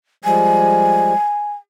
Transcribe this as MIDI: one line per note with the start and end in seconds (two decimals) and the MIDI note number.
0.24 1.13 53
0.24 1.13 55
0.24 1.13 56
0.24 1.53 80